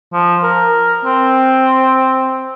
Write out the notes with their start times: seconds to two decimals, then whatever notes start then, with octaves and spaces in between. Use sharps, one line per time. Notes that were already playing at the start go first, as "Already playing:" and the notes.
0.13 F3
0.43 A#4
1.05 C4